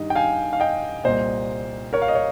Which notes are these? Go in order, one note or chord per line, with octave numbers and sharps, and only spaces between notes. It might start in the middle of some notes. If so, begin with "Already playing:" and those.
Already playing: G2 D#3 D#5
G5
F5 G#5
F5
D#5 G5
C2 A#2 C5 D#5
A#4 C#5
F5
D#5
C#5